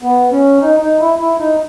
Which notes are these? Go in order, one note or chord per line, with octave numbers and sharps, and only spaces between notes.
B3
C#4
D#4
D#4
E4
E4
D#4